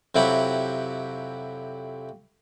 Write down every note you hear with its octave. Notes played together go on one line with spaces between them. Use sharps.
F2 C3 F#3 E4 G4 F#5